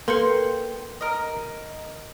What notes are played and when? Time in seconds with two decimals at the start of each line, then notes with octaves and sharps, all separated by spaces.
0.08 A#3 A4 B4 G5 C6 C#7
1.01 A#4 D#5